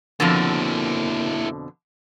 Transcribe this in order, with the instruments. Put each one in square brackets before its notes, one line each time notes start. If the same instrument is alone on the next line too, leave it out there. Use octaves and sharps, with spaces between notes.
[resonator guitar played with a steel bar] F2 B2 D3 [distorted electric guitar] A#3 E4